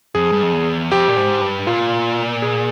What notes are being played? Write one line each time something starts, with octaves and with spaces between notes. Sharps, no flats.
F2 G#4
G2
F2
E2
F2 G4
A#2
G#2
G2
A#2 F4
G#4